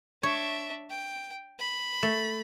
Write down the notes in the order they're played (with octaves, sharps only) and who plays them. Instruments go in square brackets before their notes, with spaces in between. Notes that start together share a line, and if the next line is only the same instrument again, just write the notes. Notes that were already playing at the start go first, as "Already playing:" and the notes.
[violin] D4 E5 [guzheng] C#5
[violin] G5
B5
[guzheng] A3